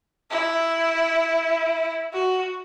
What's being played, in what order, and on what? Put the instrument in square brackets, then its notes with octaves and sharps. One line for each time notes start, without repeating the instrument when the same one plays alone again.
[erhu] E4
F#4